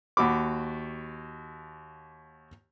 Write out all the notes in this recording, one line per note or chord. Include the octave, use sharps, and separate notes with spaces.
D#2 F#4 B5 D6